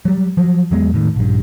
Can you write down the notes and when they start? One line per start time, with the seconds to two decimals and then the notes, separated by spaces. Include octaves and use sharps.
0.05 F#3 G3
0.37 F3 F#3
0.71 E2 F#3 G#3 B3
0.94 A2 D#3
1.16 A#1 G2